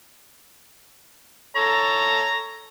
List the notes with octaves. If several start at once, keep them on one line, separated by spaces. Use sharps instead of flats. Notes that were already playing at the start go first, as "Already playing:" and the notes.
A4 C#5 A#5